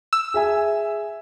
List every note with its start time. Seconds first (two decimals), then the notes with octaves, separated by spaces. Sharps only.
0.13 E6
0.34 G#4 E5 G#5